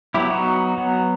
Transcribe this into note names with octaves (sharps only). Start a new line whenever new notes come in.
F#3 B3 E4 G4
D#4 F#4
F#3 B3